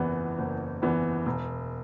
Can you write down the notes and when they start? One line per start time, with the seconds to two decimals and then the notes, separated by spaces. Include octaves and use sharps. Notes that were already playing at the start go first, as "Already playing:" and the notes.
Already playing: F#1 E2 E3 B3
0.38 F#1
0.82 E2 E3 B3
1.26 E1